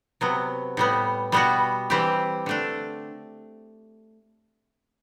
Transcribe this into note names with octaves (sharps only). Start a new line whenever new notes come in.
C3 F#3 B3
A2 G3 B3
B2 G3 B3 F#4
E3 G3 C4 G4
D3 A3 D4